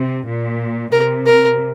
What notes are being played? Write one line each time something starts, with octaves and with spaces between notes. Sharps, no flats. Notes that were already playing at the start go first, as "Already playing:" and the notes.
Already playing: C3
A#2
C3 A#4
A#4